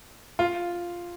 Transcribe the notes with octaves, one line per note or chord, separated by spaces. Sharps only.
F4